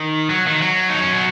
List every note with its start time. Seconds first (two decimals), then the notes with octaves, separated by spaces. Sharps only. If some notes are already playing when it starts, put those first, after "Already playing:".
Already playing: D#3
0.30 F#3
0.47 D#3
0.62 F#3
0.90 D#4
1.02 C#4
1.13 B3